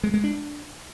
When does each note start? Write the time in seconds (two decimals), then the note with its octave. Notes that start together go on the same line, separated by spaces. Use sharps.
0.04 G#3
0.14 G#3
0.24 D4